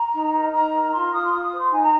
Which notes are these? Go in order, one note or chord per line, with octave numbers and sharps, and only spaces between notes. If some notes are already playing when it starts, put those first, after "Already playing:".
Already playing: A#5
D#4
A#4
D#4 A#5
A#4
F4 C6
F4 D#6
C6
F4 D#6
D#6
C5
C6
D#4 G#5
A#5